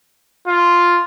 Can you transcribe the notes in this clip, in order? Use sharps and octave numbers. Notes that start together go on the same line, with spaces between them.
F4